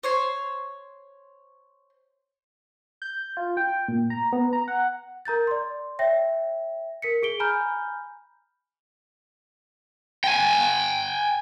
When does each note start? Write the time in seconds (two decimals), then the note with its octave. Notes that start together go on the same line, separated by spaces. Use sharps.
0.03 C5 C#5 C6
3.02 G6
3.37 F4
3.57 G5
3.88 A#2
4.10 A#5
4.33 B3
4.53 A#5
4.68 F#5
5.25 A#4 A#5 G6 A6
5.47 D5 C6
5.99 C#5 E5 G5 A#6
7.02 A#4 B6 C#7
7.23 G#4 D7 G7
7.40 G#5 A#5 B5 F6 G6
10.24 G5 G#5